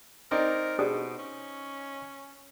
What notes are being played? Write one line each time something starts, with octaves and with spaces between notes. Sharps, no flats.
C4 D#4 A#4 D5
B2 D4 G4 G#4
C#4